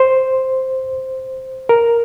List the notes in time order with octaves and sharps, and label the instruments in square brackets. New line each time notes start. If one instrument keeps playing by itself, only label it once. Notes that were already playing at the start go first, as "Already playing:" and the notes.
Already playing: [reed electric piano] C5
A#4